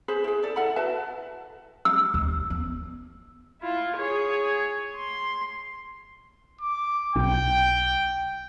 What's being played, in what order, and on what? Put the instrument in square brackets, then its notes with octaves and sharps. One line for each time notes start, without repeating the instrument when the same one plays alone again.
[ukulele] G#4 B4 C5
E4 G#4
A4 D5
E4 A4 F#5 B5
F#4 B4 E5 A5
[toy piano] E6
[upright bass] D#2
B3
[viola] E4 F4
G#4 C#5
C6
[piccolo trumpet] D6
[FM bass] B1 [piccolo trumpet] G5